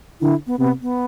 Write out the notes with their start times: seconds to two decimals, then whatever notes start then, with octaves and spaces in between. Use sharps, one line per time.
0.21 D3 E4
0.47 B3
0.59 C3 B3
0.82 B3